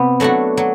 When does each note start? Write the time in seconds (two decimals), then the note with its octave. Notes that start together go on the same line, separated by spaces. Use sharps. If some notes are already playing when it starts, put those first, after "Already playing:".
Already playing: C3 B3
0.20 F#3 A3 D4 F#4
0.57 F#3